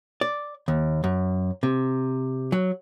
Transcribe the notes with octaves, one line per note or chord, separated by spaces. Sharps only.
D5
D#2
F#2
C3
F#3